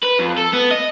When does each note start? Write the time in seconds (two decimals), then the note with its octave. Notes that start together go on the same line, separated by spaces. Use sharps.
0.03 B4
0.19 F2
0.37 A4
0.53 B3
0.71 D#5